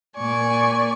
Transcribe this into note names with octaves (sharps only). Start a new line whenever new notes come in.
A#2 D5 G#5 C#6